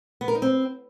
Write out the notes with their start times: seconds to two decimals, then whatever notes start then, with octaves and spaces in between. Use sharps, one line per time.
0.21 B3
0.28 A#4
0.35 D#4
0.42 C4